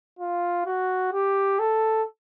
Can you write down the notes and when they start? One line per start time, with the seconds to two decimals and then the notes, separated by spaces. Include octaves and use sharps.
0.19 F4
0.66 F#4
1.13 G4
1.59 A4